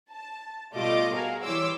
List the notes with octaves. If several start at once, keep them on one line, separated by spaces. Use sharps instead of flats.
A5
B2 G3 A3 F4 D#5 D6
F#4 G#4 A#4 F5
E3 G3 C#5 C6 D6 E6